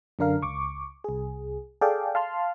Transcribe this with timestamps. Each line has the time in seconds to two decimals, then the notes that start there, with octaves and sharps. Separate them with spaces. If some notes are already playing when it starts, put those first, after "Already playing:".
0.19 F#2 D3 D4 A#4 F5
0.42 C#2 C#6 D6
1.04 C2 G#4
1.81 G#4 A4 D5 F5 G5
2.15 F5 A5 C6 F6